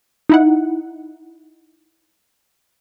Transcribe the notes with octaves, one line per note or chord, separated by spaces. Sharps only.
D#4 E4 F#5